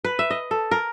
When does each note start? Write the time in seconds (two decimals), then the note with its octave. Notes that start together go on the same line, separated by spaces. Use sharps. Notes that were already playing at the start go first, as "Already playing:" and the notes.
0.04 B4
0.19 E5
0.30 D#5
0.51 A4
0.71 A#4